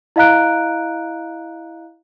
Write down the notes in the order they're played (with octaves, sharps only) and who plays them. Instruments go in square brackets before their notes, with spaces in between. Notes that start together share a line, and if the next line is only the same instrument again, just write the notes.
[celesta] E4 D#5 F5 A#5 F#6 D7